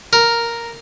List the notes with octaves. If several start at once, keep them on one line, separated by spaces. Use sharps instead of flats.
A#4